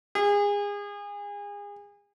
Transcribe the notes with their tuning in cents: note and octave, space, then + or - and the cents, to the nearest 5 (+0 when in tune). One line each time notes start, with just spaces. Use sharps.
G#4 -30